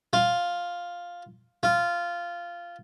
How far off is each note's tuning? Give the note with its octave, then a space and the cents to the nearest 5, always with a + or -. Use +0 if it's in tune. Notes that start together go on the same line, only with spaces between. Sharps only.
F4 +5
F4 -10